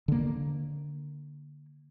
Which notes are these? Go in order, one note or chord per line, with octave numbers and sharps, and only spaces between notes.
D3 A#3